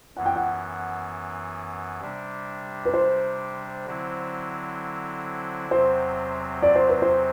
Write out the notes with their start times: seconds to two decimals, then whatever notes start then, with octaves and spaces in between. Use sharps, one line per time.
0.16 F#2 E3 B3 F#5
0.26 G5
0.36 F#5
2.01 C3 G3 D4
2.85 B4
2.94 C5
3.86 D3 F#3 C4 E4
5.71 E2 C3 F#3 C4 C5
6.62 D5
6.76 C5
6.89 B4
7.02 C5